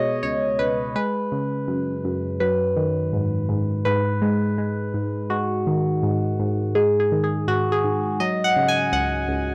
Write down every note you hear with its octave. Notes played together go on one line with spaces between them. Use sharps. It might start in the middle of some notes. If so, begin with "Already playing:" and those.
Already playing: B2 G#3 C#5 D#5
C#2 C#5
C#2 B4
G#3 B4
C#3
F#2
F#2
F#3 B4
D#3
G#2
G#2
G#2 B4
G#3
G#3
G#2
G#3 F#4
D#3
G#2
G#2
G#3 G#4
G#4
D#3
G#4
G#2 F#4
G#4
G#2
F#3 D#5
F#5
C#3
G#5
C#2 F#5
C#2